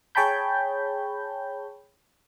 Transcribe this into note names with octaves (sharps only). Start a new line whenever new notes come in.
G#4 C#5 G5 A5 B5 G6